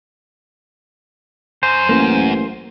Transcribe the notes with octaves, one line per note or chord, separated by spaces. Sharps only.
F#2 C5
A1 A#3